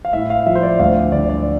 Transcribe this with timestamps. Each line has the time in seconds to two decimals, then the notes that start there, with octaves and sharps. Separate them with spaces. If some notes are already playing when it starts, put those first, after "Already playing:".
0.05 F5
0.13 A2 E5
0.30 F5
0.46 F3 E5
0.55 C5
0.63 D5
0.79 D2 F5
1.12 D3 D5
1.29 D5